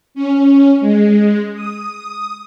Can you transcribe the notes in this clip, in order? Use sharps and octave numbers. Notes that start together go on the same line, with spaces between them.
C#4
G#3
D#6